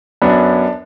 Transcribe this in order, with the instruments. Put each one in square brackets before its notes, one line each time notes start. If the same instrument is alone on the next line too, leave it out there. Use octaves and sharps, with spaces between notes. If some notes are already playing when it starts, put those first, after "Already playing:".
[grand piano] F#2 F#3 B3 D4